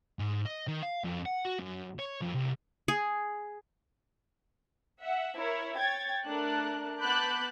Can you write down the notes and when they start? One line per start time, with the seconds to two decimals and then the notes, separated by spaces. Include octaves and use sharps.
0.19 G#2
0.46 D#5
0.68 D#3
0.82 F5
1.04 F2
1.25 F#5
1.45 F#4
1.59 F#2
1.99 C#5
2.22 F2
2.35 C2
2.88 G#4
5.00 E5 F#5
5.36 E4 A#4 C#5
5.77 C#5 G5 G#6 A6
6.26 A3 D4 A#4 F#6
7.00 B3 A5 B5 D6 F#6 G6